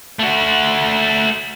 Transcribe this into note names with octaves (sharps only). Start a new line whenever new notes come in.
A3 F#4